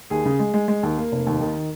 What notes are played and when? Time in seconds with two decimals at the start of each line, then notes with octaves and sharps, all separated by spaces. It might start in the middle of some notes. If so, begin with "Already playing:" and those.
0.10 D#2 G#4
0.25 C#3
0.39 G#3
0.54 G#3
0.68 G#3
0.83 D#2
0.98 A#3
1.12 F1
1.27 D#2
1.41 D#3